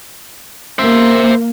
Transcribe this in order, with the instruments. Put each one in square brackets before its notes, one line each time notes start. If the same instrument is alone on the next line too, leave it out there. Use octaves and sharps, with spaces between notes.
[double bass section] A#3 [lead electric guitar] C5 E5